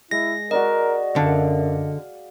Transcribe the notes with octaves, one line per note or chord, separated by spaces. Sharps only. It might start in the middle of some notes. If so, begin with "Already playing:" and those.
G#3 E4 A#6
F#4 A#4 D5 D#5 C6
F#2 D3 F5